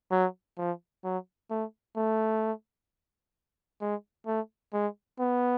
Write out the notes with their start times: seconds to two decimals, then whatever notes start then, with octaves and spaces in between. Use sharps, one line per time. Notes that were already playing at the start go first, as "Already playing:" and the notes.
0.11 F#3
0.57 F3
1.04 F#3
1.50 A3
1.96 A3
3.81 G#3
4.26 A3
4.73 G#3
5.19 B3